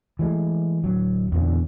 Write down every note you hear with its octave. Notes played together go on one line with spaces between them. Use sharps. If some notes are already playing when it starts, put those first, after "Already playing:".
E3 F#3 G#3 A3
D1 F#3
E2 A#2 D3 C#4